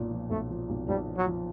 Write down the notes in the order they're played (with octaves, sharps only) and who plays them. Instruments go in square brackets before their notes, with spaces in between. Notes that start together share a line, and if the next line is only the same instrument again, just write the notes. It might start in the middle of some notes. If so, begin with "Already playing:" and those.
Already playing: [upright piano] B1 A#2
F3
[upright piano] B1 [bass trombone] A3
[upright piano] F3
B1
[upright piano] B1 [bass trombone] G3
[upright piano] F3
[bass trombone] F#3
[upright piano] F3